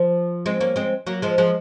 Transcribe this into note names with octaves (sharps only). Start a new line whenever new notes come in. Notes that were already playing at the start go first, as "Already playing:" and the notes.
Already playing: F3
G#3 C4
A#3 C#4
G#3 C4
F#3 A#3
F3 G#3
F3 G#3